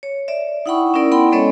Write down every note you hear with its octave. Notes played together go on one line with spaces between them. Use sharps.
C#5
D5 E5
D#4 E4 F#5 G5 B5 C#6
C#4 D#4 E4 A#4 D5
B3 E4 F#5 G5 B5 C6
G#3 B3 C#4 A4 C#5 D#5